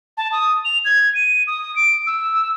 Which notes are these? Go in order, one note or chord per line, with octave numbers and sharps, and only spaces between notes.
A5
D#6
F7
G#6
D#7
D#6
D7
E6